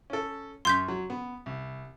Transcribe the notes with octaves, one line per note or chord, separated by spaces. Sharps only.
C#4 A4
F#2 C6 G6 B6
F#3
B3
C2